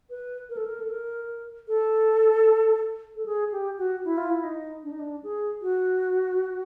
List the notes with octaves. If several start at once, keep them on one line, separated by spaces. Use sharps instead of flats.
B4
A#4
A4
A#4
A4
A#4
A4
A4
G#4
G4
F#4
E4
F4
E4
D#4
D4
D#4
D4
G#4
F#4